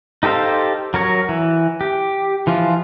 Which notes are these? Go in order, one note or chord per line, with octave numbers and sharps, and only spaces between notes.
D#4 G4 A4 C5 F5
F#3 A#4 C#5
E3
G4
E3 F3 F4